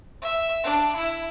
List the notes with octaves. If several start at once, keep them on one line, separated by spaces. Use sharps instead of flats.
E5
D4
E4